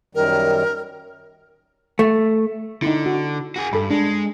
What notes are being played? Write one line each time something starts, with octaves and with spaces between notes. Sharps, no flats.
F#2 D#3 G3 A#4
A3
D3 D#4 E4
F#4
F#4 G#4
G2 A4 B5
G#3 D4